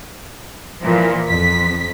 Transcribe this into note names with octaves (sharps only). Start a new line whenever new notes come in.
A#2 E3 F3
F2 B6